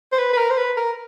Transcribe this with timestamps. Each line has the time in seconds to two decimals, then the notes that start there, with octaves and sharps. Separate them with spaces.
0.12 C5
0.19 B4
0.33 B4
0.37 A#4
0.50 C5
0.57 B4
0.77 A#4